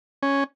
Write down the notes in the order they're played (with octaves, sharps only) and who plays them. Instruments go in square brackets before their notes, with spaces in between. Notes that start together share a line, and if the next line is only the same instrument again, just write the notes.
[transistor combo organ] C#4